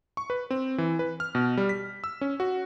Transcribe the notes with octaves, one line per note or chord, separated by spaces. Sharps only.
C#6
B4
C4
E3
B4
F6
B2
G3
B6
E6
C#4
F#4